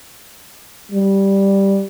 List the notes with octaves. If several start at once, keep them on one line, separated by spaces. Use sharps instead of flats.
G3